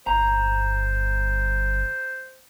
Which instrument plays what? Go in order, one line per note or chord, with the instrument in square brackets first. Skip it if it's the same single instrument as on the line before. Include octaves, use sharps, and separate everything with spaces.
[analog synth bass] G1 [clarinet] C5 [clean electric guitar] A#5